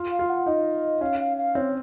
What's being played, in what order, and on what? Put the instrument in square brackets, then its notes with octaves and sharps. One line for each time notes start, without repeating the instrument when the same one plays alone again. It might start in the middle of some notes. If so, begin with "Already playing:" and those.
Already playing: [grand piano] F4
[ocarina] F5
[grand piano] F4
[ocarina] F#5
[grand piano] D#4 [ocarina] D#5
[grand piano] C#4 [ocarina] F5
[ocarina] F5
F5
[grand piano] C4 [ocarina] C#5